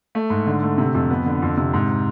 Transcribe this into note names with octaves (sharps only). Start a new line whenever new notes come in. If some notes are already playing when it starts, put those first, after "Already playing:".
A3
G#2
D3
A3
C3
F2
B3
D3
F2
C3
G#2